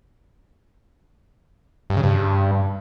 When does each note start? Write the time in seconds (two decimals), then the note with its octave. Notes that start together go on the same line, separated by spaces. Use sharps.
1.90 G2
1.97 C#3
2.03 G2